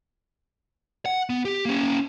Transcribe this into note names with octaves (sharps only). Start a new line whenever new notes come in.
F#5
B3
G4
A#3 C#4